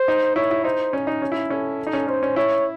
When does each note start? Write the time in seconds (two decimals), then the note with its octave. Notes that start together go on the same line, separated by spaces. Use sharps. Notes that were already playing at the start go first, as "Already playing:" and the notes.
Already playing: C5
0.08 D#4
0.36 E4 C#5
0.51 E4
0.64 D#4 C5
0.93 C#4
1.07 D#4
1.22 C#4
1.32 E4
1.50 C#4 A4
1.87 D#4
1.93 C#4
2.07 C#4 C5
2.23 C#4
2.36 E4 C#5